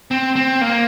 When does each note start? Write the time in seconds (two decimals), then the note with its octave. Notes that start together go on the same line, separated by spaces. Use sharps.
0.11 C4
0.36 C4
0.61 A#3